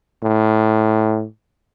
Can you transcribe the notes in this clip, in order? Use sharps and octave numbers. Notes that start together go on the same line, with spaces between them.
A2